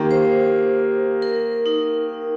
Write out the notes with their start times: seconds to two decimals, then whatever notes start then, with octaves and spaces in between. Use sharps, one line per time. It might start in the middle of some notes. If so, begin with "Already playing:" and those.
Already playing: D#3 A#3 F4 G4
0.11 C5
1.22 A#4
1.66 D#4